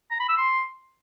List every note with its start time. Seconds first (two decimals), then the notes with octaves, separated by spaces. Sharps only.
0.11 A#5
0.20 B5
0.29 E6
0.37 C6